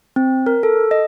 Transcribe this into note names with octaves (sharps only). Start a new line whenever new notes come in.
C4
A#4
A4
D#5